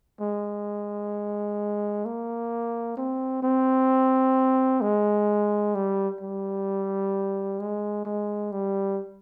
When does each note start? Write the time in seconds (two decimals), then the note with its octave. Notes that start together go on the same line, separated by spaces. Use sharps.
0.21 G#3
2.05 A#3
2.97 C4
3.43 C4
4.81 G#3
5.75 G3
6.21 G3
7.60 G#3
8.05 G#3
8.52 G3